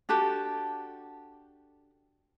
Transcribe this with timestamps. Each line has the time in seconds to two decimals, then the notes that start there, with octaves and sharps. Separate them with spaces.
0.09 D4 F#4 G4 A4